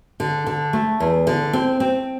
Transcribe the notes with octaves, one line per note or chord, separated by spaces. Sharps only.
D3
D3
A3
E2
D3
C4
C4